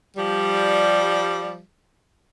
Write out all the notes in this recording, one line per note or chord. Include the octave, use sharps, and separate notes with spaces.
F3 G3